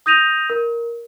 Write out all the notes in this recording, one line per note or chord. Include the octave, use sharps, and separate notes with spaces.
D#6 G6 A#6 D#7 F7
A#4